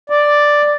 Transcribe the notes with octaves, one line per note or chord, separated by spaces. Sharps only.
D5